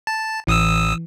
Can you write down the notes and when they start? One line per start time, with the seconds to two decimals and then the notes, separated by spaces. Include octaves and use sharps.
0.07 A5
0.47 A1 E3 D#6 E6